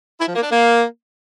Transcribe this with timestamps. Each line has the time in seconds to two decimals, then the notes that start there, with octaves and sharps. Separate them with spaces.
0.20 E4
0.28 F3
0.35 A#3
0.43 D4
0.51 A#3